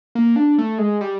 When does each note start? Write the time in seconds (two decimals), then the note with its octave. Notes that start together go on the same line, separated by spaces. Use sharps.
0.15 A#3
0.36 D4
0.58 A3
0.78 G#3
1.01 G3